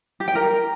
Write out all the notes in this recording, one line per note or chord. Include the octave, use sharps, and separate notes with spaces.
G4
G5
A#4